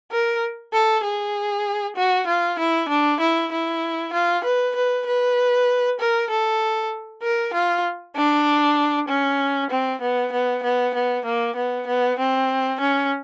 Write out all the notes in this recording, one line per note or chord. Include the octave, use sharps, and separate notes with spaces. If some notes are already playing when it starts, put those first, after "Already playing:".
A#4
A4
G#4
F#4
F4
E4
D4
E4
E4
F4
B4
B4
B4
A#4
A4
A#4
F4
D4
C#4
C4
B3
B3
B3
B3
A#3
B3
B3
C4
C#4